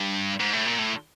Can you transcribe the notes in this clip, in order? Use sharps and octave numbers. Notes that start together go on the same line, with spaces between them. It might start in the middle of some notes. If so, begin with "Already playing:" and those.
Already playing: G2
G#2
A2
A#2
A2